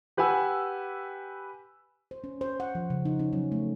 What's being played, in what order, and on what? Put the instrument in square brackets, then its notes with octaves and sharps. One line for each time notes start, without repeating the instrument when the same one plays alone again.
[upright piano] G4 B4 F#5 G#5 E6
[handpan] C5
C#4
C5
F#5
F3
C#3
D#4
C#4
F#3
A3